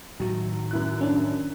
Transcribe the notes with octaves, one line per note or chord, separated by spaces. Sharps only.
A2 D#3 F#3
F#2 E4 F#6
C#4 D4